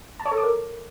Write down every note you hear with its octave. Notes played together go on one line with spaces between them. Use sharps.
A5
C#5
A4
D6
A#4